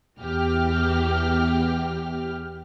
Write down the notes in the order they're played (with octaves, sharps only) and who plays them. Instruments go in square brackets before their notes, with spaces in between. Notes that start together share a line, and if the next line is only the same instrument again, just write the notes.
[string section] E2 E3 G4 F6